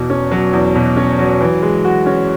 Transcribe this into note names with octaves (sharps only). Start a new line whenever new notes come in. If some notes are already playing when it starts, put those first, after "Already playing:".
Already playing: E2 B2
C#4
F#3
E2
B2
C#4
F#3
E3
G#3
F#4
C#4